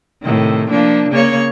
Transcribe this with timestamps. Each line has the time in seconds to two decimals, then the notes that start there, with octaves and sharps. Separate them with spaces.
0.22 A2 C3 D#3
0.70 F3 A#3 D4
1.10 C#3 A#3 C#5